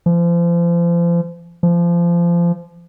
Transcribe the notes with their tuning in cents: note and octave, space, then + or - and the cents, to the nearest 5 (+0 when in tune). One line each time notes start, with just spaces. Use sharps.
F3 -35
F3 -25